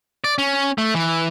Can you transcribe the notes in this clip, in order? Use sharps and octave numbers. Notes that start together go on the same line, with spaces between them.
D5
C#4
A3
E3